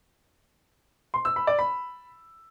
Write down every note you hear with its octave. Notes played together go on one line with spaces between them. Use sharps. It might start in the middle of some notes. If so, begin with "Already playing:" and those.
C6
E6
B5
D5
B5